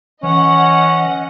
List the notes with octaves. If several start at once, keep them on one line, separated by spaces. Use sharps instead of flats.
E3 C#4 D#5 F#5